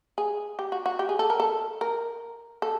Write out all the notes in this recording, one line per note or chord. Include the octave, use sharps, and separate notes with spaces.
G#4
G4
F#4
F#4
G4
G#4
A4
A#4
A4
A#4
A4